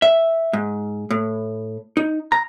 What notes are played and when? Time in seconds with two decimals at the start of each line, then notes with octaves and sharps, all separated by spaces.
0.02 E5
0.53 G#2
1.11 A2
1.97 D#4
2.32 A#5